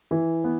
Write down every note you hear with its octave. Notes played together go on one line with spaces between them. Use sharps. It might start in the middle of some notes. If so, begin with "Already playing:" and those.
E3
B3